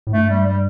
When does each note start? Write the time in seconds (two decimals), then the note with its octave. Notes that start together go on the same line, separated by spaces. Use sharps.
0.07 A2
0.13 G2 A3
0.30 G3
0.46 G3